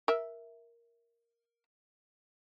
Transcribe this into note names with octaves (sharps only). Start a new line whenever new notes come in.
A#4 E5